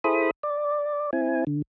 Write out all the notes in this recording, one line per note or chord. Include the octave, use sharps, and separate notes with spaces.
E4 G#4 A4 C5 B5 D#6
D5
C4 E4 G#5
D3